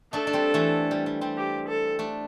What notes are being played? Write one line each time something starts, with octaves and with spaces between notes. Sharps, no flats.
A3 D4 A4
D4
G3 C4
E3 A3
G3
G3
G3 C4
G4
A4
A3 D4